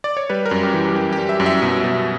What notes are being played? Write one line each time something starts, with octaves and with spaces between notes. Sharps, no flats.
D5
C#5
G3 B4
A#4
F#2
G4
E3
F#2 G4
G4
G3
E5
F#2
E5
B2
B2